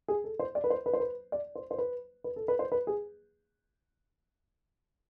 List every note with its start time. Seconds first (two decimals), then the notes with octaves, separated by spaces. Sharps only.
0.08 G#4
0.24 A4
0.39 C5
0.55 D5
0.64 B4
0.70 C5
0.86 B4
0.93 C5
1.00 B4
1.32 D5
1.55 C5
1.71 C5
1.78 B4
2.24 B4
2.36 A4
2.48 B4
2.59 C5
2.72 B4
2.87 G#4